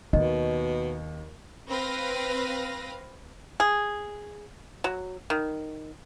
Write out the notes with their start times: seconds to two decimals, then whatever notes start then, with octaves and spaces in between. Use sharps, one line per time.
0.13 D#2 B2 F4 D#5
1.67 C4 B4 F5 A#6
3.60 G#4
4.84 F#3
5.30 D#3